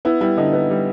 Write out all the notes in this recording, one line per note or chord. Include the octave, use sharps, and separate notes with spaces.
B3 E4
G3 E4
D3 D#4
B3
G3